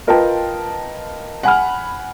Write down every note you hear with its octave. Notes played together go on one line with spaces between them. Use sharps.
F4 A#4 B4 D#5 G5 A5
F#5 G#5 B5 F6